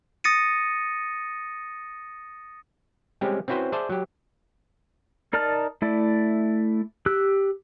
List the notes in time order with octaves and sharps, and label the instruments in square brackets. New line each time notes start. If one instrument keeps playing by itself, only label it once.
[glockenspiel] D#6 A6 A#6 C#7 D#7
[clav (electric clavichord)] G3 G#3 C4 C#4 G4
C4 C#4 E4 F#4 B4 C5
G#4 C5 D5 E5 A5
F#3 G4
[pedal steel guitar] D#4 A#4 D5 A5 F6
A3 E4 D5
G4 E6 F#6